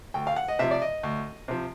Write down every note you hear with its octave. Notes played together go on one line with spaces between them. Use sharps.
D2 G5
F5
F#5
D#5
C3 F3 E5
D5
D#5
D2
C3 F3